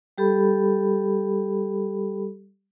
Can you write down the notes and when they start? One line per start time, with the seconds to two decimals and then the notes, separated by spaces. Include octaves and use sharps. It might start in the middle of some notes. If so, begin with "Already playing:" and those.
0.18 G3 G4 A4 B5